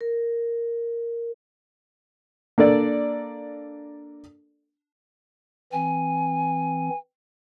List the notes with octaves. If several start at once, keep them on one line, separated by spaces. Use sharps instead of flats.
A#4
A#3 D4 A4 D5
E3 C4 G#5